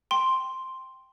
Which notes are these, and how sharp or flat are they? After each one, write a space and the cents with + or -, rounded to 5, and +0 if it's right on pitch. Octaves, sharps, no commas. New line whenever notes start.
G5 +0 C6 +0